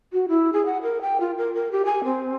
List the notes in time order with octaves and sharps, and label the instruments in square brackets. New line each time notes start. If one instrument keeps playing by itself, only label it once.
[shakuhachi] F#4
E4
G#4
F#5
A#4
G5
F4
A#4
A#4
G4
G#5
C4